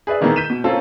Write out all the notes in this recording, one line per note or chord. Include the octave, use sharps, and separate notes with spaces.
G#4 B4 D5 E5
A#2 D#3 E3 G#3 A#3 B3
G6 B6 D#7 E7
B2
A#3 C4 C#4 F4 A4